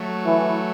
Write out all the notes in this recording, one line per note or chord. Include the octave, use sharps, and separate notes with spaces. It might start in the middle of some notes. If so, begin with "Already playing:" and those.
Already playing: F#3 A3
E3